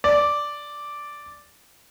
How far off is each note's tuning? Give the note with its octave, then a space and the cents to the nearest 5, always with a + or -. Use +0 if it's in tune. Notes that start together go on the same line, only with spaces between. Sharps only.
D5 -5